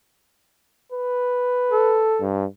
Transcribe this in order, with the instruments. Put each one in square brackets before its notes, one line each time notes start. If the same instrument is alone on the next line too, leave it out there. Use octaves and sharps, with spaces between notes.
[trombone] B4
[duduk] A4
[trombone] G2